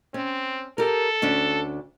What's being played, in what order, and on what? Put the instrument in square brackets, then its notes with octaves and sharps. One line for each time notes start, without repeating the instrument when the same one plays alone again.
[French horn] C4 [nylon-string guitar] C#4
[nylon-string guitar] G4 A#4 [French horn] A4
[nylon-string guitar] D2 C#4 D4